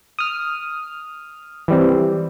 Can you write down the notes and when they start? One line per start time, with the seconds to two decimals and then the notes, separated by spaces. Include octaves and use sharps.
0.19 D#6 F6
1.68 E3 G3 C4